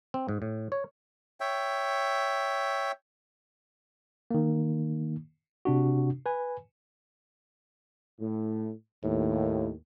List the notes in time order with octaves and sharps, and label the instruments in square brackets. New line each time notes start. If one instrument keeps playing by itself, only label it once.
[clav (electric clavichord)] C4
G#2
A2
C#5
[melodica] C#5 E5 G5
[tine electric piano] D#3 A#3
C3 D4 F#4
B4 G#5
[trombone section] A2
[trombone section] D#2 [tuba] A2